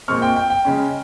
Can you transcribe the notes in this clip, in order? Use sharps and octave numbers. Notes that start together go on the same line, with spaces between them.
A#2 G#3 C4 C#6 F6
G5
G5
G5
C#3 G#3 C#4